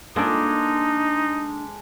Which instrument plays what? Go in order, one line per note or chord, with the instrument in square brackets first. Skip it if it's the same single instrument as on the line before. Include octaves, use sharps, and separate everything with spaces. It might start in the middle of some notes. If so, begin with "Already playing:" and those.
[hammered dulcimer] G#3 A4 D6 [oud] A#3 D4 [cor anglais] D#4